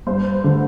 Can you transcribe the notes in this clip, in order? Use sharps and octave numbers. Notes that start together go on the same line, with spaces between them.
G2 C5
D3 A3